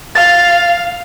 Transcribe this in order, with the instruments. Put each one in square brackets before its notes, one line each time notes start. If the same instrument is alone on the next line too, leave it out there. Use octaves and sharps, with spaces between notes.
[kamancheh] F5 [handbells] A6